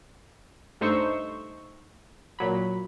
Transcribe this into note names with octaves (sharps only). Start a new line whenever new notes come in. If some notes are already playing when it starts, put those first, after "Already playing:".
G2 A3 D#4 C5 C#6 E6
A#2 F#3 B5